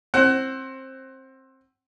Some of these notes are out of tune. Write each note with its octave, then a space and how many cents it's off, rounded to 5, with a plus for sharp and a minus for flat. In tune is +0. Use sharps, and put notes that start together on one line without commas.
C4 +20 F#5 +30